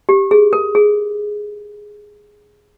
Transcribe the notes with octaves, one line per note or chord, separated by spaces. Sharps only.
G4
G#4
A#4
G#4